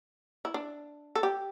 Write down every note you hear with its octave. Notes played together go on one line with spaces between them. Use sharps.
E4
D4
A4
G4